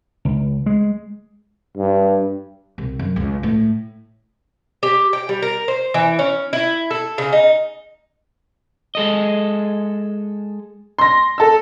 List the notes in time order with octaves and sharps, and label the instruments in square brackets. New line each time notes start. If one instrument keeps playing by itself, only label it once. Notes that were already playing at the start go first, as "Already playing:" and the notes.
[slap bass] C#2
G#3
[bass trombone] G2
[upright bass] C2
F#2
C#2
A2
[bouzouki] G4
G5
G3
A#4
C5
E3
C#4
E4
A4
C#3
D#4
[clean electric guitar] G#3 A4 D#5
[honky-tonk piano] C6 A#6
A4 E6